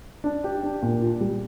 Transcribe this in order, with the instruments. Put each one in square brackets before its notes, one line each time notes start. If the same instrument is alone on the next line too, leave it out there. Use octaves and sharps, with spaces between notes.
[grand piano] D4
G4
D4
A#2
F4
G3